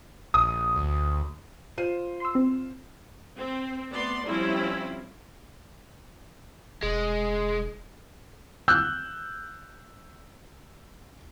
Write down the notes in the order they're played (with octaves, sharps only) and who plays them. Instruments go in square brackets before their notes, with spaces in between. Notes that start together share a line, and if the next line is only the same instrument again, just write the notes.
[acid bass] A#1 [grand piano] D#6
[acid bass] D2
[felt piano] F4 C5 D#7
[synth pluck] C6 E6
C4
[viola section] C4
A3 B3 D5 C6
F3 G3 C4 C#4 E4
[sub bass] E1 [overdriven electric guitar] G#3
[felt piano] E6 F#6 G6